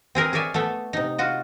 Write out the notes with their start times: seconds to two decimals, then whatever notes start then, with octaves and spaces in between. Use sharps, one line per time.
0.15 C4 G#4 A#4 B4
0.33 G#4 A#4 C#5 D5 E5 G#5
0.54 A3 B3 A4 E5
0.93 C3 D#4
1.18 F4 F#4 D#5